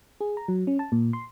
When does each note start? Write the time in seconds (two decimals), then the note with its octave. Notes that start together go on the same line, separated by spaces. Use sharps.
0.21 G#4
0.37 A#5
0.48 F#3
0.67 C#4
0.79 A5
0.92 A#2
1.13 C6